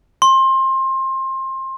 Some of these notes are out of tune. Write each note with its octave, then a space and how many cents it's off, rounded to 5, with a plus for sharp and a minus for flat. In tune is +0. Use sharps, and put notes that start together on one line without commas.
C6 +25